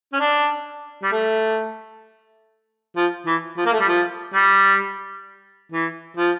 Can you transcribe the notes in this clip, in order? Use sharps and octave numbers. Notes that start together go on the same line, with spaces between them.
C#4
D4
G3
A3
F3
E3
F3
A#3
A3
G3
F3
G3
E3
F3